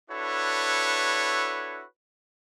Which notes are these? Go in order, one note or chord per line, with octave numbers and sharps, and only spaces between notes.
D4 E4 F#4 A4 B4 C#5